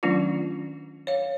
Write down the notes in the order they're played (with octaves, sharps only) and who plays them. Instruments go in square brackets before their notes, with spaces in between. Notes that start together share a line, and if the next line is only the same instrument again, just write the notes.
[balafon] D#3 F#3 A3 C#4 D4 F4
C#5 F5